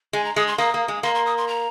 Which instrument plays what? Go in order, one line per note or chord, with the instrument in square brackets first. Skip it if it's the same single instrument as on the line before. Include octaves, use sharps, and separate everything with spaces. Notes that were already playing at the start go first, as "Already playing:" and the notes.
[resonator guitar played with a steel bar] G#3 [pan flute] G#5
[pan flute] A#5
[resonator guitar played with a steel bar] G#3 [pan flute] D#6
[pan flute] C6
[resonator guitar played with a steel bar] A#3 [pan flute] D#6
[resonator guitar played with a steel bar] A#3
G#3
[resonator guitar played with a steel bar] A#3 [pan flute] C6
[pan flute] C6
D#6
C6
A#5